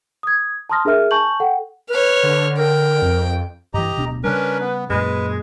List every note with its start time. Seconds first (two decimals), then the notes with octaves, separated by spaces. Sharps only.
0.23 D#6 G#6
0.70 A5 A#5 C6 D#6 F6 A#6
0.85 D4 G#4 A#4 E5 F6
1.11 G#5 A5 C#6 G6 F#7
1.40 A4 F#5 G5
1.90 B4 C#5 F6
2.23 D3
2.58 A#4 G5
3.02 F2
3.74 G2 E3 G4 D#5 A#5
3.96 D1 B2 D4
4.24 C#3 G3 C#4 D4 A#4 B4
4.60 B3
4.90 F#2 A#2 G#3 B4